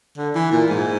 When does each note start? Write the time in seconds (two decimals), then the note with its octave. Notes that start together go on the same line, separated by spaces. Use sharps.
0.17 D3
0.35 E3
0.52 A#2
0.69 G#2